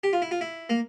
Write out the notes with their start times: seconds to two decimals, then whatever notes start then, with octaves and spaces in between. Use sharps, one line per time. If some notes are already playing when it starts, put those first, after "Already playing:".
0.04 G4
0.13 F4
0.22 E4
0.31 F4
0.41 E4
0.70 A#3